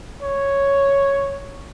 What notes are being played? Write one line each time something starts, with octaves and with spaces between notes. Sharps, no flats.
C#5